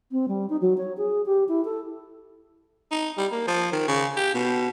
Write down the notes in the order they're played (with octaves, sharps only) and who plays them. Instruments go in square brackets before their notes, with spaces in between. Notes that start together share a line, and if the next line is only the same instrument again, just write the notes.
[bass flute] C4
G3
D#4
F#3
C#5
G#4
G4
E4
A4
[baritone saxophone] D#4
G3
A#3
F3
D#3
C#3
G4
B2